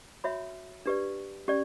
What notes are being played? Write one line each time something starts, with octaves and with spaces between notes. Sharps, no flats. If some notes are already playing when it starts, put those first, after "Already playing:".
F#4 C#5 E5 B5
D4 G4 B4 D5
C#4 G4 D5